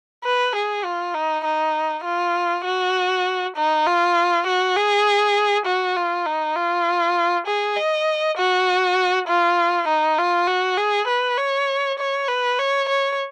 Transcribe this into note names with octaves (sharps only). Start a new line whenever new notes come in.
B4
G#4
F4
D#4
D#4
F4
F#4
D#4
F4
F#4
G#4
F#4
F4
D#4
F4
G#4
D#5
F#4
F4
D#4
F4
F#4
G#4
B4
C#5
C#5
B4
C#5
C#5